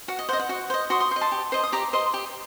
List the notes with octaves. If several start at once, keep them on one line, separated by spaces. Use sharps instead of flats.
F#4 F#5
D#5
C5 D#5 F#5
F#5
F#4
C5 D#5
F#4 C6 D#6
C6 D#6
C5 D#5
A5 C6
G4
C5 D#5
D#6
G4 A#5 D6
C5 D#5 C6 D#6
G4